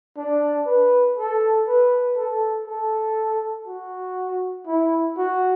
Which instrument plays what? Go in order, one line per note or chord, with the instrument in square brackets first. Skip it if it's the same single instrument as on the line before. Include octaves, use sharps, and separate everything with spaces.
[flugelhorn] D4
B4
A4
B4
A4
A4
F#4
E4
F#4